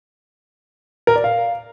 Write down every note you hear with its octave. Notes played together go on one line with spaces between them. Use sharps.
A#4
D5
F5